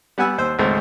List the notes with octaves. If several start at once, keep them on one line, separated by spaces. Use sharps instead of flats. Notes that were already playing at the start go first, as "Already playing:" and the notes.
G3 B3 F#5 G#5 E6
D#2 C5 E6
G#1 C#2 G#3 A3 C4 C5